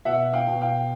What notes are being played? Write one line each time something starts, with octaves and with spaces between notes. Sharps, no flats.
B2 E5 F#5
F5 G5
B2
F5 G5